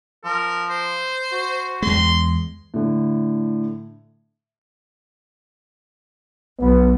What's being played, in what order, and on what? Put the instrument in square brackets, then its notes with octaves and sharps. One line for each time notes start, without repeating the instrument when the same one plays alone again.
[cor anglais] F3 [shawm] A#4
[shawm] C5
[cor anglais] F#4
[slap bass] E2 G#3 [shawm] C6
[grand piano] A2 D3
[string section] B1 [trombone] B3